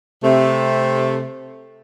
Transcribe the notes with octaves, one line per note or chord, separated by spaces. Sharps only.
C3 A3